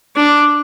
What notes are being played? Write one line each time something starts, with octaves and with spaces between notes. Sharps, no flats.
D4